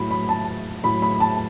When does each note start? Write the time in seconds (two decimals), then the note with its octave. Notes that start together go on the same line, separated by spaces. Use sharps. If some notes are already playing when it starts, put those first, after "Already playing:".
Already playing: A2 F#3 B5
0.11 B5
0.29 A5
0.83 A2 F#3 B5
1.02 B5
1.20 A5